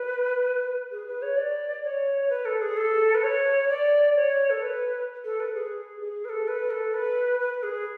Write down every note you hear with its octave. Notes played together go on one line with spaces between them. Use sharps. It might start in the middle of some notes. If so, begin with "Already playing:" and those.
Already playing: B4
G#4
B4
C#5
D5
C#5
B4
A4
G#4
A4
B4
C#5
D5
C#5
A4
B4
A4
B4
G#4
G#4
B4
A4
B4
A4
B4
B4
G#4